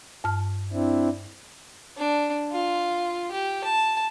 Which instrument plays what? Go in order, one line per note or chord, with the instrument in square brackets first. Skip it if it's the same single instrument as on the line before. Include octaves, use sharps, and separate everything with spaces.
[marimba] G2 A5 F6
[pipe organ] C4 D4 E4
[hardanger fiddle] D4
F4
G4
A5